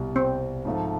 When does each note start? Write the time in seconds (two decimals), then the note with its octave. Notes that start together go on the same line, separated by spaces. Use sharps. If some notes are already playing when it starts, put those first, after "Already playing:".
Already playing: C2 B2 G3
0.16 C4
0.65 G#2 F3 A3